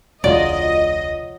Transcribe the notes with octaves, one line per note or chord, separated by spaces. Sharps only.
E1 C#2 F#3 F4 D5 D#5